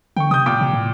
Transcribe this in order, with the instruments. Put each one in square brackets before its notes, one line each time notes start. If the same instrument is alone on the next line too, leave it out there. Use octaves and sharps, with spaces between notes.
[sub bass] D3 [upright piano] G5 C#6
[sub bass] C3 [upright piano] D#6 G6
[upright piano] A#2 G5 D6
[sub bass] C3
A2